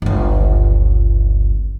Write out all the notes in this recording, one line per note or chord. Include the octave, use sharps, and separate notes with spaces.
G1 C#2